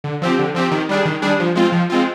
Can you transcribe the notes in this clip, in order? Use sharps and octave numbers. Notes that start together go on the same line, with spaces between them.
D3
F3 C4 G4
D3
F3 C4 G4
D#3
G3 D4 G#4
D#3
G3 D4 G#4
F3
G#3 C4 F4
F3
G#3 C4 F4